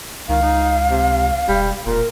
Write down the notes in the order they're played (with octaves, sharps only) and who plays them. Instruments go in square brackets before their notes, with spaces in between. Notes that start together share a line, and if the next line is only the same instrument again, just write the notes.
[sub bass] C#2 [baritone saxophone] D#3 [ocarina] F5
[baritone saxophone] D#4
C3
[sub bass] E1 [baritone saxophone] G3
[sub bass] E1 [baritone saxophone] A#2 [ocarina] A#4